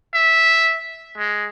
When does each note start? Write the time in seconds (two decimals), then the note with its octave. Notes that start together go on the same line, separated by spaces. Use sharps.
0.14 E5
1.18 G#3